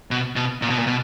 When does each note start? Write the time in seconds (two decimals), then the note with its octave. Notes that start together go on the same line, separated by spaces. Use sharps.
0.11 B2
0.36 B2
0.62 A#2
0.70 B2
0.78 A#2
0.87 B2